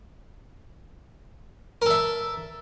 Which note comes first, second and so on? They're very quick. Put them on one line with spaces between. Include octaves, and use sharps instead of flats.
A#4 A4 E5